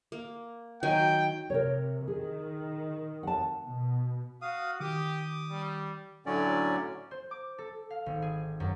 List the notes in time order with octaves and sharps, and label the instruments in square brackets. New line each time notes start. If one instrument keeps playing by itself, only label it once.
[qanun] A#3
[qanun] D#3 F#3 G#5 [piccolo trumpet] G5
[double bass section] C3 [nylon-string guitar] A#4 C#5
[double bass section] D#3 [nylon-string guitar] G#4
[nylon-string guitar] F#5 A5
[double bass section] B2
[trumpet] F#4 [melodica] F5 D#6
[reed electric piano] D#3 [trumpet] G4 [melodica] D6 D#6
[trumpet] G3
[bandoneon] A2 D3 F#3 C#4 D5
[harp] C5
D6
A4
F5
G#1
G#4
F#2